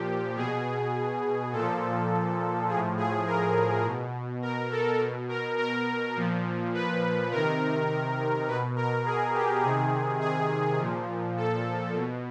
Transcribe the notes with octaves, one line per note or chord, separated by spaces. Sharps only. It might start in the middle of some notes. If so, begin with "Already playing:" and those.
Already playing: A#2 F3 G4
B2 G#4
A#2 F3 A4
A2 F3 G#4
G#4
A#4
B2
A#4
A4
B2
A#4
A#4
A#2 F3
B4
C3 D#3 A#4
B2 B4
A#4
G#4
G4
C3 D#3 G#4
G#4
A#2 F3
A4
B2